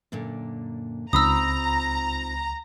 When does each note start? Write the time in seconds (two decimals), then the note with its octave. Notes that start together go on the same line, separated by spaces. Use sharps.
0.12 F#2 A#2 D3
1.13 C#2 C4 D#4 F4 A#5 B5 D#6 E6